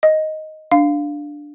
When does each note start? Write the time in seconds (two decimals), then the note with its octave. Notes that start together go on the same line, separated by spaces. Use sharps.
0.03 D#5
0.72 D4 F5